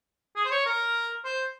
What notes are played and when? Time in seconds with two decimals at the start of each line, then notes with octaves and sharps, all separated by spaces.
0.36 G#4
0.45 C5
0.51 C#5
0.66 A#4
1.25 C5